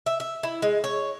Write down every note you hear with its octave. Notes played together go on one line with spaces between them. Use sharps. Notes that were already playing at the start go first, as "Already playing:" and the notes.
E5
E5
E4
G#3
C#5